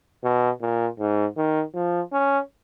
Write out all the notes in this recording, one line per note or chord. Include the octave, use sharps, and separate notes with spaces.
B2
A#2
G#2
D#3
F3
C#4